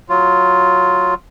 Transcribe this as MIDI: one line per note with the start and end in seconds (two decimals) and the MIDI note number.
0.09 1.14 54
0.09 1.14 65